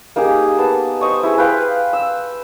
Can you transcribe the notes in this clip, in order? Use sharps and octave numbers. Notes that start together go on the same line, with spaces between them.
A#3 D#4 G4 G#4
B3 A5
C5 D#5 C#6
E4 G#4
B4 F5 G5 C6
E6